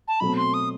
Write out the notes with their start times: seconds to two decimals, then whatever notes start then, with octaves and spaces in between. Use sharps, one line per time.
0.08 A5
0.20 B2 F#3 A3 C4 B5
0.37 C6
0.54 D#6